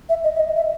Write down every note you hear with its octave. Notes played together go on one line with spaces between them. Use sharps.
E5
D#5
E5
D#5
E5